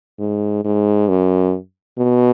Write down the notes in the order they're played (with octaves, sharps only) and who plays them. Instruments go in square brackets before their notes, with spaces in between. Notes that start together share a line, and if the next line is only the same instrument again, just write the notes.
[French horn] G#2
G#2
F#2
B2